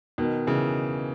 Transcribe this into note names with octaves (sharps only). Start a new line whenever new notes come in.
B2 D#3
C#3 E3